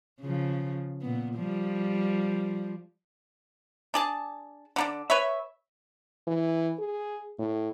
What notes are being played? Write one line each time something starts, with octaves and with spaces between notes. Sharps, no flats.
C#3 F3
A#2 B3
F3 G3
D4 G#4 A5
D3 A#3 D4
B4 C#5 E5
E3
G#4
A2